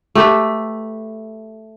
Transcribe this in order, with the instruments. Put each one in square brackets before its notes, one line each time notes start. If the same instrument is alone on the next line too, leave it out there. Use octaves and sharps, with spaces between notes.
[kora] A3 G4 A4 B4